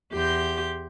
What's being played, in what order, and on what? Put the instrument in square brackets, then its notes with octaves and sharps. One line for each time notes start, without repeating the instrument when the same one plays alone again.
[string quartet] E2 G4 C6 G6